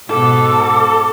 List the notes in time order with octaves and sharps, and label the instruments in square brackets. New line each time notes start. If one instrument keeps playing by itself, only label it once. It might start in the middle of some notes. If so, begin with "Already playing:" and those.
[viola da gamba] G#2 B2 [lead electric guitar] A4 [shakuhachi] D6